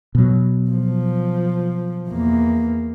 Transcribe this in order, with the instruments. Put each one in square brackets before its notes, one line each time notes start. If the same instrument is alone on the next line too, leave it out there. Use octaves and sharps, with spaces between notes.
[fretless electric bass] B2 F#3
[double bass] F3
E2 A#3